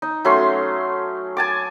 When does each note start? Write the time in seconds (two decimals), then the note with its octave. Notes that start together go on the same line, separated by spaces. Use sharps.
0.02 D#4
0.25 F#3 A3 C#4 C6
1.37 G#5 A5 D6